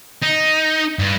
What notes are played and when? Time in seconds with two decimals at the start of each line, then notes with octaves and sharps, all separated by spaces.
0.22 D#4
0.99 G2